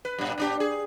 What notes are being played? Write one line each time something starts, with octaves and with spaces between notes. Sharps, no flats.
B4
G2 A#2
A#2 D4 G4
G#4